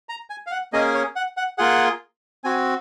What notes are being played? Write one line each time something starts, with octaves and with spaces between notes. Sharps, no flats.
A#5
G#5
F5
F#5
A#3 C#4 G#4 D#5
C#5
F#5
F#5
A#3 F4 G#4 F#5
C4 F#4 G#5